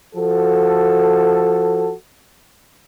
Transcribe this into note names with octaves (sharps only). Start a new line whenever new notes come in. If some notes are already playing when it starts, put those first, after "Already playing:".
F3 F#4 A4